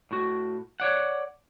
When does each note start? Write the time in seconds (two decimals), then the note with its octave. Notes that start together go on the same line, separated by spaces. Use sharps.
0.11 A2 F#4
0.80 C#5 D5 F#5